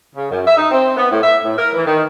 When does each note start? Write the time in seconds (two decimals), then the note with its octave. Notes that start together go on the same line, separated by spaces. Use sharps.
0.15 C#3
0.31 F#2
0.45 E5
0.57 D#4
0.71 C4
0.96 B3
1.11 A2
1.23 E5
1.44 A2
1.56 A#4
1.74 E3
1.86 D#3